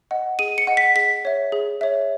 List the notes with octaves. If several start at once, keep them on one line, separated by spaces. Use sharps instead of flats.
D#5 F#5
G#4 D#7
C#7
D#5 F#5
B6
G#4 B6
C#5 E5
G#4
C#5 E5